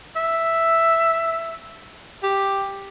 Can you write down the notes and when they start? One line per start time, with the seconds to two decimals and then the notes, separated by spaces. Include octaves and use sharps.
0.16 E5
2.23 G4